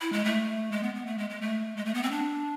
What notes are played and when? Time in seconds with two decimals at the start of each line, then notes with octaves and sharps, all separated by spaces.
0.01 E4
0.13 G#3
0.25 A3
0.72 G#3
0.83 B3
0.95 B3
1.06 A3
1.18 G#3
1.30 G#3
1.41 A3
1.77 G#3
1.85 A3
1.94 B3
2.03 C4
2.12 D4